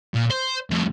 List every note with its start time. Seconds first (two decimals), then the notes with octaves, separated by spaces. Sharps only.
0.15 A#2
0.31 C5
0.70 F2 A2